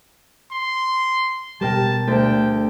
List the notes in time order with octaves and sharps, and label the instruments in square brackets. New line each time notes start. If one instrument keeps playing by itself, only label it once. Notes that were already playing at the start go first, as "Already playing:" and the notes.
[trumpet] C6
[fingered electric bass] B2 G3 [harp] G4 A#4 G5 [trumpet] A5
[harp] D2 [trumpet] G5